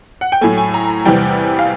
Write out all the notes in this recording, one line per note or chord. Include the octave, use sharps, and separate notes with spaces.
F#5
G5
A2 F#3 A3 G#5
G#5
A#5
E2 C3 E3 G3 G5
F5